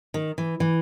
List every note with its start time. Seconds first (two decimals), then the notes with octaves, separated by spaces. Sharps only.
0.14 D#3
0.38 E3
0.60 E3